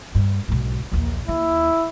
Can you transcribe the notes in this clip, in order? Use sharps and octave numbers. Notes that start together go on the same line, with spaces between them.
G2
B1 G#2
A#1 D#2
D#2 E4